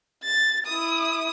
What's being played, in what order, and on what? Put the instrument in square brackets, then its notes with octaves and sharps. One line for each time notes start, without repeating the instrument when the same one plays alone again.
[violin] A6
E4 D#6